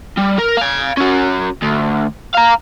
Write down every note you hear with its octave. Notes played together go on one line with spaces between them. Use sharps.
G3
A#4
F5 G#5
C#4 F#4
D2
F5 A#5